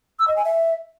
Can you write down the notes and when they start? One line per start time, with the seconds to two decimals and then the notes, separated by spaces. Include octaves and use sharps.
0.19 E6
0.28 D#5
0.36 G#5
0.45 E5